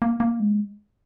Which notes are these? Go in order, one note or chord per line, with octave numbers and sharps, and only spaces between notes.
A#3
A#3
G#3